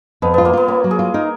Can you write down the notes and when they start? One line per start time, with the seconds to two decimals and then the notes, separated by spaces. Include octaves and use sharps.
0.22 F2 B3
0.34 B3 F4
0.45 A#3
0.53 B3 F4
0.68 A#3 C#4
0.84 F#3
0.91 G#4
0.99 F4
1.14 D#4 A#4